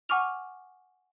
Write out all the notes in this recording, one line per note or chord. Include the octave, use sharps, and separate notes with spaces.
F#5 G#5 C#6 D6 F6 F7